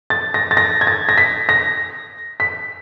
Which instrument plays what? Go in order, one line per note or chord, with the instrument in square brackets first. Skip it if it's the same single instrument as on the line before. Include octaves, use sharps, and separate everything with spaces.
[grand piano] A6
A#6
A6
A#6
G#6
A6
A#6
B6
A#6
B6